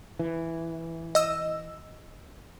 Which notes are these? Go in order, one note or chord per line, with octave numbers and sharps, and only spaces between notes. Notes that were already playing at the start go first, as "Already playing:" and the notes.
E3
D#5 E6